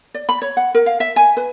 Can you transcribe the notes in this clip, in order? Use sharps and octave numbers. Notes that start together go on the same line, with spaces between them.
D5
B5
C#5
F#5
A#4
F5
E5
G#5
B4